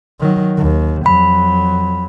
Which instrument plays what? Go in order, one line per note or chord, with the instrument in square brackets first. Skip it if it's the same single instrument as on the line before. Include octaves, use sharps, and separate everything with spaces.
[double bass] D#3 F#3
D#2
[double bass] F2 F#3 [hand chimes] B5